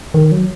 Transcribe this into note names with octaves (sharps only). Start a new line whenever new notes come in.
D#3
F#3